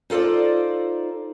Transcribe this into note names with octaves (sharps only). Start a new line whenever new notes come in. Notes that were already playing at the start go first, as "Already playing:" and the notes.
D#4 F4 A4 C5 D5